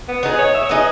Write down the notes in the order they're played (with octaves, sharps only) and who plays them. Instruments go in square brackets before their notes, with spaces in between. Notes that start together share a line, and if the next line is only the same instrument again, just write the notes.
[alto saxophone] B3
[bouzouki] B3 D#4 G#4
[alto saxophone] C#5
E5
C#5
[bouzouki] B3 D#4 G#4 [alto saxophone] D#5